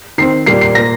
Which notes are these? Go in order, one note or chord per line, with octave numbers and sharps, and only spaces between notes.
D#3 C4 C7
A#2 G3 A#3 C7
C7
A#2 A#3 A#6